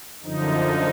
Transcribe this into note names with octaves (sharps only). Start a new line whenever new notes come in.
F#2 D3 F3 D#4